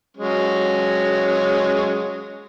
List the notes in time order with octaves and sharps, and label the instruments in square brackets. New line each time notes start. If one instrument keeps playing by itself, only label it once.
[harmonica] F#3 G#3 C#4